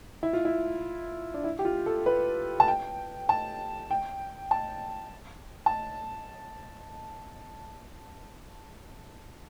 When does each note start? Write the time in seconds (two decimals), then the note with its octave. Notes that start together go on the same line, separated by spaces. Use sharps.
0.23 E4
0.33 F4
0.45 E4
1.34 D4
1.44 E4
1.59 G4
1.65 F4
1.86 A4
2.06 B4
2.60 A5
2.68 G5
3.29 A5
3.91 G5
4.51 A5
5.66 A5